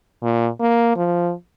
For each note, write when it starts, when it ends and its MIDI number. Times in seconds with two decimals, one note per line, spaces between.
0.23 0.48 46
0.61 0.92 58
0.96 1.32 53